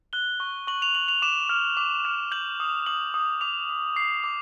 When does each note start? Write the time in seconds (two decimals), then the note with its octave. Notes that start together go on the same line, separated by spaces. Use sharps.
0.13 F#6 G7
0.40 C#6
0.67 C#6 F#7
0.82 F7
0.95 C#6 F#7
1.08 F7
1.22 D6 E7
1.49 F6
1.77 D6
2.05 F6
2.32 G6 F#7
2.60 D#6
2.86 D#6 F#7
3.14 D#6
3.41 D6 F7
3.69 D6
3.96 D6 C7
4.24 D6